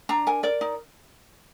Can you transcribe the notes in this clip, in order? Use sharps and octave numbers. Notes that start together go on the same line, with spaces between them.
D4 A#5
A#4 G#5
A#4 D5
D#4